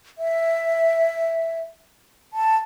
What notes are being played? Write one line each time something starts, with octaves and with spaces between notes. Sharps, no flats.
E5
A5